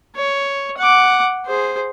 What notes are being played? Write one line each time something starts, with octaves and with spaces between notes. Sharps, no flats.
C#5
F#5 D6
G#4 C5